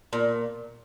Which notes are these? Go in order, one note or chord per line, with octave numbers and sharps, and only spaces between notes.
A#2